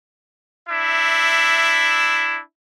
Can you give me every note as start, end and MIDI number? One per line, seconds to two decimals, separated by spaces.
0.69 2.39 62
0.69 2.39 64
0.69 2.39 76